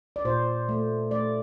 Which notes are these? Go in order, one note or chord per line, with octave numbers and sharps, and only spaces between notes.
D5
A#2 C5
A3
A3 D5